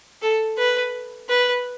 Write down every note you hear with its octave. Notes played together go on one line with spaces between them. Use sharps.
A4
B4
B4